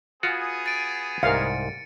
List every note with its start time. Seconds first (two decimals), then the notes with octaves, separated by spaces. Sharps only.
0.23 B3 F4 F#4 G#4
0.66 A6 D7 D#7
1.23 C2 G#2 A#4 F5 C#7